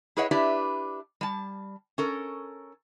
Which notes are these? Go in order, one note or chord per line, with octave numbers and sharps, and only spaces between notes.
E4 G#4 B4 C#5 D#5 F#5
D4 E4 G4 B4 D5 E5
G3 A5
C#4 A4 A#4